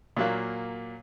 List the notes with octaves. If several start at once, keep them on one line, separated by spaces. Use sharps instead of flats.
A#2 F#3 A#3